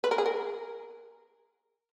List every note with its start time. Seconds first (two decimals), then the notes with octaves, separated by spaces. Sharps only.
0.04 B4
0.11 A#4
0.18 G#4
0.26 A#4